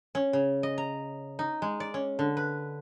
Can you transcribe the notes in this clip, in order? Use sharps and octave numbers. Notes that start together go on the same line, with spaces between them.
C#4
C#3
D#5
A#5
D#4
G#3
D5
C#4
D3
B4